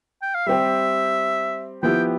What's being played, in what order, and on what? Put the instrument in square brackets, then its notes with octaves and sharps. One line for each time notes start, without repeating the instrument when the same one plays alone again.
[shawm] G5
F5
[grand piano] G3 C4 G4 [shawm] E5
[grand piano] F3 B3 E4 G4 [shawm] G5